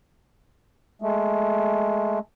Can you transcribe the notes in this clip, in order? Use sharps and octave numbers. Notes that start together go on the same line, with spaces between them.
G#3 A3